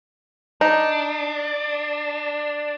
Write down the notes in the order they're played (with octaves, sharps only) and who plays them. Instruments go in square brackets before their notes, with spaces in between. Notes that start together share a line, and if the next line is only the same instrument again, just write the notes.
[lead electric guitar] D4 [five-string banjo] D#4